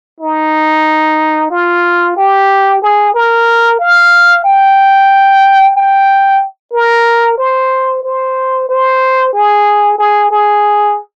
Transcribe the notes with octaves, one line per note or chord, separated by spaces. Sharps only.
D#4
F4
G4
G#4
A#4
F5
G5
G5
A#4
C5
C5
C5
G#4
G#4
G#4